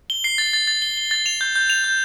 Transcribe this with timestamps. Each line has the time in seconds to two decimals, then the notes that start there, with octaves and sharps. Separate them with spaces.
0.10 G7
0.24 C7
0.38 A6
0.53 A6
0.68 A6
0.82 G7
0.97 G7
1.11 A6
1.26 F7
1.41 G6
1.56 G6
1.70 F7
1.84 G6